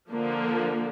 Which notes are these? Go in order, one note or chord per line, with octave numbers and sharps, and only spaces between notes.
D3 F3 A#3